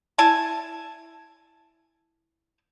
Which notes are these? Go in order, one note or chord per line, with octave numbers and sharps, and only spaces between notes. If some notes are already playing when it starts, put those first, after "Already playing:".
E4 G#5 A5